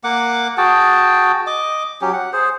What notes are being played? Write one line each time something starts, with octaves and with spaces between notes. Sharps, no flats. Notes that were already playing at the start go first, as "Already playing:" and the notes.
A#3 F#5 D6
F#4 G#4 G5 A5
D#5 D6
F#3 C#4 G4
F#5
G#4 C5